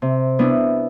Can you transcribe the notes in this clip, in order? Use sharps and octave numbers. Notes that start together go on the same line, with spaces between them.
C3
B3 D4 E4